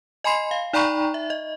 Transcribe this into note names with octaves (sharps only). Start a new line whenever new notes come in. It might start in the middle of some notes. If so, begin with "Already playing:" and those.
D#5 G#5 B5 C6 C7
F5
D#4 D5 G5 A#5 B5 C#6
E5
D#5